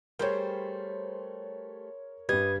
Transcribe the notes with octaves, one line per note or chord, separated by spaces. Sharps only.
G3 A3 G#4 A#4 C5 C#5 C6 G6
G2 G3 B4 D#5 G#6